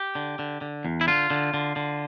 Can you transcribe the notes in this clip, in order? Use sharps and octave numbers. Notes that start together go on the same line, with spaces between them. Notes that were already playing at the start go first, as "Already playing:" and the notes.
Already playing: G4
D3
D3
D3
E2
E4
D3 F4
D3
D3
D3